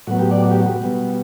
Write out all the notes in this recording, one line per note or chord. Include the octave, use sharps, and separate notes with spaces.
A2 F#3 B3 F#4
G4
D5
F#4
G4
F#4
B2 G3 B3